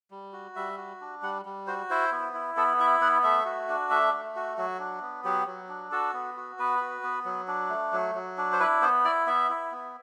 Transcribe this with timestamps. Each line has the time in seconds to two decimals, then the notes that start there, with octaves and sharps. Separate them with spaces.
0.11 G3
0.33 F#4
0.56 G3 E5
0.78 F#4
1.01 D4
1.22 G3 F#5
1.45 G3
1.67 F#4 C5
1.90 E4 C5
2.12 B3
2.34 E4
2.57 B3 A4
2.80 E4 E5
3.01 B3 F#5
3.24 A3 E5
3.45 F#4
3.69 D4
3.90 A3 E5
4.13 A3
4.36 F#4
4.58 F#3 F#4
4.79 D4
5.02 B3
5.24 F#3 G4
5.47 F#3
5.69 D4
5.92 F#4 A4
6.14 B3
6.37 F#4
6.59 B3 B4
6.81 F#4
7.03 B3
7.25 F#3
7.48 D4
7.70 A3
7.93 F#3
8.15 F#3
8.38 D4
8.53 C5
8.60 E4 B4
8.82 B3 C5
9.05 E4 D5
9.26 B3 E5
9.49 E4
9.72 B3